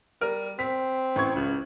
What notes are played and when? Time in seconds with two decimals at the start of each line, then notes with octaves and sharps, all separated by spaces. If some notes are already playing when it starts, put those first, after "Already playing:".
0.21 G3 A#4
0.59 C4 B6
1.16 A1 C#6 G#6
1.35 C#2